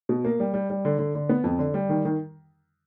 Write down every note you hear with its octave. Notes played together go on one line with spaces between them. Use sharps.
B2
A#3
G3
G3
G3
D3
D3
D3
B3
F2
D3
G3
D#3
D#3